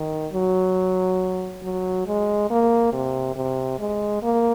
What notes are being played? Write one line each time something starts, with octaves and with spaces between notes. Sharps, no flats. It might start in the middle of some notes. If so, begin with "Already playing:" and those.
Already playing: D#3
F#3
F#3
G#3
A#3
C3
C3
G#3
A#3